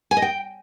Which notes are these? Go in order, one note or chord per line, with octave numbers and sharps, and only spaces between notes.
G#5
D#5
G5